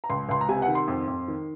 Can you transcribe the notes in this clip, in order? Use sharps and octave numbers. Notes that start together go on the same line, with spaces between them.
A#5
C#2 C6
C#2 C6
A#5
C3 G#5
F#5
D#3
C6
F2
F2
D#3